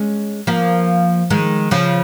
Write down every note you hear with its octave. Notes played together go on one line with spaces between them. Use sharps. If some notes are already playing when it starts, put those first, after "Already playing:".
Already playing: G#3 C#4
F3 A#3
D#3 G#3
C#3 F3